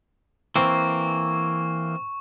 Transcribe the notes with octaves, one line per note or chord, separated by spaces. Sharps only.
E3 A#3 C4 C#6